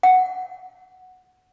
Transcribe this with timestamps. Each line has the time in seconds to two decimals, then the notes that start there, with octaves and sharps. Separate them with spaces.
0.03 F#5